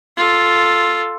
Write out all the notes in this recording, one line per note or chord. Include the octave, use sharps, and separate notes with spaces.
F4 A4